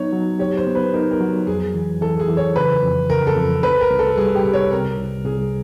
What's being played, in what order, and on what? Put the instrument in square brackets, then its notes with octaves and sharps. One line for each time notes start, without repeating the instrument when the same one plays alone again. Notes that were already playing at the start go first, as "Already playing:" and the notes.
Already playing: [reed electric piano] F#3 B3 D#4 [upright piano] C#5
[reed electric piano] F#3
[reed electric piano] G4 [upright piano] C#5
[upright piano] C5
[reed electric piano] B3
[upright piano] B4
[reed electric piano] D#4 [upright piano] A#4
[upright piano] A#4
[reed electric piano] F#3
[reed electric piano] F2 [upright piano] G#4
[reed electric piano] E3
[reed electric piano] E3 [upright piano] A4
[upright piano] G#4
[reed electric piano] E3
[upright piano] C#5
[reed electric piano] C#3 [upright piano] B4
[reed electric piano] F2
[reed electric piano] C#3 [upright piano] A#4
[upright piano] A4
[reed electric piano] F2
[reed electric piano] C2 [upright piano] B4
[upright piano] A#4
[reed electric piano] C2
[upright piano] A4
[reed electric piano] G3 [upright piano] G#4
[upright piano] G4
[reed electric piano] C3
[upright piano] C#5
[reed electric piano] C3 [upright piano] A#4
[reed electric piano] C2
[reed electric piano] C2 [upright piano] G#4